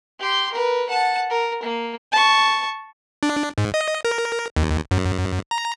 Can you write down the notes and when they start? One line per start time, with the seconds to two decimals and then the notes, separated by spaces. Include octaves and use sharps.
0.20 G4 C6
0.52 A#4 B4
0.90 F#5 A5
1.30 A#4
1.63 A#3
2.12 A5 C#6
3.23 D4
3.58 G#2
3.74 D#5
4.05 A#4
4.56 D#2
4.91 F#2
5.51 A#5